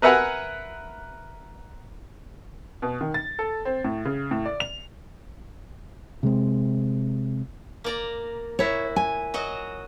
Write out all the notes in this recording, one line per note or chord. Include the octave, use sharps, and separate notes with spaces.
A#4 B4 E5 F#5 G#5 A#5
B2
D#3
A6
A4
C4
A2
C#3
A2
D5
F7
C3 G#3 C4
A#3 D5 A#5
A#2 E4 F#4 C#5
G#5
F#3 F#4 D#5